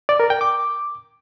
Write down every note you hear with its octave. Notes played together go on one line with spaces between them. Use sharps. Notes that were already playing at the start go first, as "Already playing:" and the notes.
D5
A#4
G5
D6